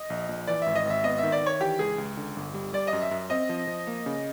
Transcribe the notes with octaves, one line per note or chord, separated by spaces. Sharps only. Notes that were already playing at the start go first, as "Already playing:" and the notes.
Already playing: D#5
A#1
A#1
E3 D5
G#1 E5
D#5
G#1 E5
B3 D#5
D#3 E5
D5
D#3 C#5
E3 G4
C#2 G#4
C#2
D3
G1
G3
G3 D5
D#5
F#2
E5
F#2
C4 D#5
F3
F3
A#3
C#3